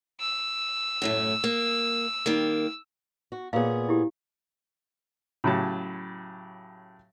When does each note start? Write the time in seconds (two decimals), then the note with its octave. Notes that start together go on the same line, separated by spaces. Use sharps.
0.20 E6
1.02 F#2 A2 A3
1.44 A#3
2.26 D#3 G3 A#3
3.32 F#4
3.53 A#2 B3 G#4 C#5 F5
3.89 E4 G4
5.44 A2 C#3 F#3 G4 A5